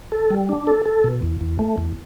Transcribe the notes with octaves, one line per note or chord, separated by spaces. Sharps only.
A4
G3
D4
A4
A4
B2
E2
E2
A3
E2